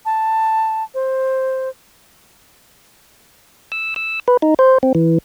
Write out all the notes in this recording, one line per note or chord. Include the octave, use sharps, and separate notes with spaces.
A5
C5
E6
E6
B4
D#4
C5
C4
E3